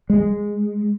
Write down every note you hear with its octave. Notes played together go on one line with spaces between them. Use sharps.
G#3